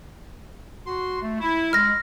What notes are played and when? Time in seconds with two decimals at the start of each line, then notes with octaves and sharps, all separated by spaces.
0.87 F#4 C6
1.21 A3
1.41 E4
1.73 G#3 F6 A#6